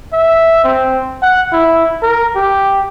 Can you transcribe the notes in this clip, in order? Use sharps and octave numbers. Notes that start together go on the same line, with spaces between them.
E5
C4
F#5
E4
A#4
G4